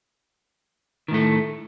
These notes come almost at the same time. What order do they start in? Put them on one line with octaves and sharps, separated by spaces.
D#3 A2 A3